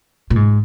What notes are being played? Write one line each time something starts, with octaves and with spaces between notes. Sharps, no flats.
A#2
G#2